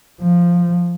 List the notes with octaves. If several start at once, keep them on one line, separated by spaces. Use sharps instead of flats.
F3